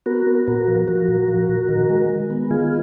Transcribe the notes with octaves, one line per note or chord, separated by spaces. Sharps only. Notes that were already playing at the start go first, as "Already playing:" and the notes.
B3 F#4 A#4
B3
A#2 F#4 A#4
F3
F3 F#4 A#4
A#2
F3
A#2
D#3
G#3
G#3
B3
D#3 F4 G#4